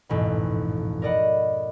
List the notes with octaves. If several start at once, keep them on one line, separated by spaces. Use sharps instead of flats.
A1 F2 G#2 B2
A#4 D5 D#5 F#5 B5